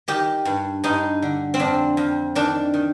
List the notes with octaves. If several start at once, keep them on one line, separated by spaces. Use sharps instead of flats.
D#3 G4
G2
G2 D#4
D3
C4
F2 D4
F2
D#3 D4
D#3